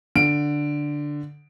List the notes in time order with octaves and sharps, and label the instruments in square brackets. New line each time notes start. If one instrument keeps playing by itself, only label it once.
[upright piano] D3 D7